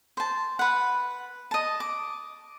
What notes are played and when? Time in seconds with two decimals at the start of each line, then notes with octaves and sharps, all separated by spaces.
0.17 C5 A5
0.59 B4 F#5
1.51 D#5 A5
1.80 D6